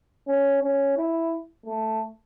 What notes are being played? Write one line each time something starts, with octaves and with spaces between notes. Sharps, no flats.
C#4
C#4
E4
A3